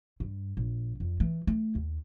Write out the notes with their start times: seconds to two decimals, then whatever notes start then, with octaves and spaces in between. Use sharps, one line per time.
0.20 G2
0.57 A#1
1.00 F2
1.20 E3
1.47 A3
1.75 D#2